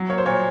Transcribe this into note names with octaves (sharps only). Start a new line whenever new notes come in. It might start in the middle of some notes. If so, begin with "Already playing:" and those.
Already playing: F#3
A#3 C#5
C5
A#2 C#5